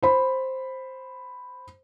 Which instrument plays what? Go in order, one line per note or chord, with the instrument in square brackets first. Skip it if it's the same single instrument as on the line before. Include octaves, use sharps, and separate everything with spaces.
[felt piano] C5 B5